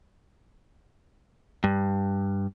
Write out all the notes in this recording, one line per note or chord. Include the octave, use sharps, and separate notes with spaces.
G2